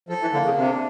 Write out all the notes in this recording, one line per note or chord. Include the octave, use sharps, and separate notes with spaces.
F3 A4
E3
D3 A#3
C#3
C3 D4